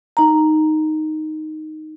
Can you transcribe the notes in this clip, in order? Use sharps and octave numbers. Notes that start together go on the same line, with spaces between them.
D#4 A#5